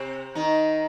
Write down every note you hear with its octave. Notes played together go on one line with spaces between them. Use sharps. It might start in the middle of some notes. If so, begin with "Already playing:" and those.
Already playing: C3 C4
D#3 D#4